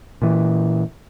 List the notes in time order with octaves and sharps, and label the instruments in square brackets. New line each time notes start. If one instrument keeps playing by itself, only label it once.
[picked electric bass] A#2 E3